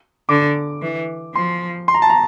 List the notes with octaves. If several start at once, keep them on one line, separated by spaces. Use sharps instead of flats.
D3 D6
E3
F3 C6
C6
A#5
A5
A#5